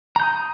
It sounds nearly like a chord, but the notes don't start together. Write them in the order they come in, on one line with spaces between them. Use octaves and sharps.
A#5 G6 D#6